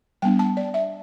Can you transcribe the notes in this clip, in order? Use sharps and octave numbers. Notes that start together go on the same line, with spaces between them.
G3 B3 D4 G5
A5
D5
E5